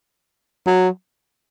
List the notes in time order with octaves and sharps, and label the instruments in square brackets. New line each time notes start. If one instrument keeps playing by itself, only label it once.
[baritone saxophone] F#3